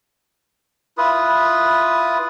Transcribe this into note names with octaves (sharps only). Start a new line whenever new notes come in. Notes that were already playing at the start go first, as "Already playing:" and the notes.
E4 F4 B4 D#6